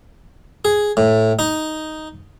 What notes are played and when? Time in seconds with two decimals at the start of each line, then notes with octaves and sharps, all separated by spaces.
0.65 G#4
0.97 A2
1.39 D#4